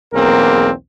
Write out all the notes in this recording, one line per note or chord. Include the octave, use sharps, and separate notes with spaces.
B1 E2 A#3 C4 G#4 A#4